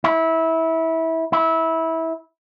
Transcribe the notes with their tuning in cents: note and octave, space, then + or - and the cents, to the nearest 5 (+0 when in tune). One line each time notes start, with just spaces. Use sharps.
E4 -20
E4 -20